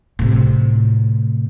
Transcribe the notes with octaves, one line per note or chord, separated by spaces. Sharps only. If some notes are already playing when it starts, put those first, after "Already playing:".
A2 C3